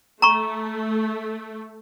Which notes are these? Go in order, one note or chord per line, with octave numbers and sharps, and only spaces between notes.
A3 A#5 C#6